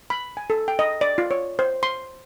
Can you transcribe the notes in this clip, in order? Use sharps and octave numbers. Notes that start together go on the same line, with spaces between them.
B5
G#5
A4
G5
D#5
D5
F4
C#5
C5
C6